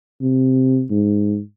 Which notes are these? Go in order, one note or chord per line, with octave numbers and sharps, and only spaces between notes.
C3
G#2